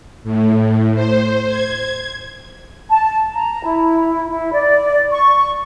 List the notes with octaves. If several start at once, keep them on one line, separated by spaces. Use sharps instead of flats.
A2
C5
G#6
A5
A#5
E4
E4
D5
C#6